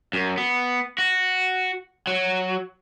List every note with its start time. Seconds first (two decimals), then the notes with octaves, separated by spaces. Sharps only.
0.13 F#2
0.37 B3
0.98 F#4
2.07 F#3